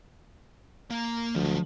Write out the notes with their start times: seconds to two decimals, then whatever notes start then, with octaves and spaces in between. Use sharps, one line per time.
0.91 A#3
1.35 D2 F3 F#3